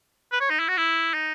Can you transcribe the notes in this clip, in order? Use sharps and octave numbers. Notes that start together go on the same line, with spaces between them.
B4
C#5
D#4
E4
F#4
E4
D#4